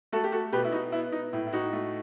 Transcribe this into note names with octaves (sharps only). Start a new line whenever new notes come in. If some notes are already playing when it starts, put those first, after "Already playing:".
A3 F#4 A4
G4
F#4 A4
B2 G4 B4
E4
D#4 F#4
B3 E4
D#4
A2 E4
E4
D#4 F#4
A3